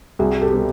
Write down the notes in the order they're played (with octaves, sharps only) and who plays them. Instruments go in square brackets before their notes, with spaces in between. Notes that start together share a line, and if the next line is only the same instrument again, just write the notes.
[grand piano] C2 [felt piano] F#4 G#4
[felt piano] G4 A4
[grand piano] B2 G3 B3